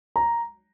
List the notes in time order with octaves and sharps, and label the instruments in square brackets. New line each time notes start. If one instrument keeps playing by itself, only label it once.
[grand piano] A#5